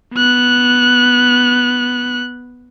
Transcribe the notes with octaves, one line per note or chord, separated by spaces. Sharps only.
B3 F#6